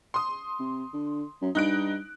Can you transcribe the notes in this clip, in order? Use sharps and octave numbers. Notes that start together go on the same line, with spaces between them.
C6 D#6
C3
D3
F#2
G2 D#4 F#6 D7